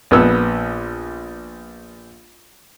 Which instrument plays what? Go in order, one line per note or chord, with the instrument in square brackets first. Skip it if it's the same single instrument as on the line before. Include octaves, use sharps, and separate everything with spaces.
[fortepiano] A#1 B3 E6